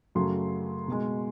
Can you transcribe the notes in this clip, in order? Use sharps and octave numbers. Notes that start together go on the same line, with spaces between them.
F#2 C#3 F#3 A3 C6
B2 G#3